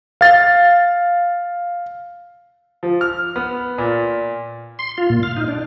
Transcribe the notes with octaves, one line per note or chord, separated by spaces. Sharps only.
F5 A6
F3
F6
B3
A#2
C6
F4
A#2
F5
D#4
D4